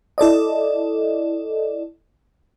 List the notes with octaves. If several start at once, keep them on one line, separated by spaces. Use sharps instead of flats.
E4 A4 D5 D#5